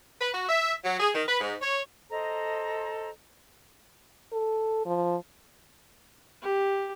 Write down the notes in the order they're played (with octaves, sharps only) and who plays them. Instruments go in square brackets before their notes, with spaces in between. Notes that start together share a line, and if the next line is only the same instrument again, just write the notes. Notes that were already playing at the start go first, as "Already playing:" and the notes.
[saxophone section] B4
F#4
E5
F#3
G#4
D#3
B4
G#2
C#5
[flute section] A4 C5 D#5 A#5
[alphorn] A4
F3
[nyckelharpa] G4